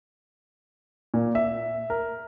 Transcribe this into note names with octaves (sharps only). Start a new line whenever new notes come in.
A#2
E5
A#4